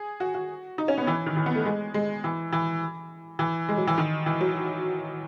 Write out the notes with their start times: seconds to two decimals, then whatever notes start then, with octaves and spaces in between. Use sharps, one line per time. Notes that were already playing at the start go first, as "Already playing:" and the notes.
Already playing: G#4
0.20 F#4
0.35 F#4
0.78 D#4
0.88 C#4
0.98 B3
1.07 E3
1.26 D#3
1.37 E3
1.46 B3
1.55 A3
1.66 G#3
1.94 G#3
2.24 E3
2.53 E3
3.39 E3
3.69 G#3
3.77 F#3
3.87 E3
3.98 D#3
4.26 E3
4.41 F#3